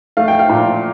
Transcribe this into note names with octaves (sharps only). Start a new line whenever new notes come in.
A3 F5
G5
F5
A#2